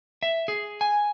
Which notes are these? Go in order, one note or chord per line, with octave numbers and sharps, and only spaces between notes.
E5
G#4
G#5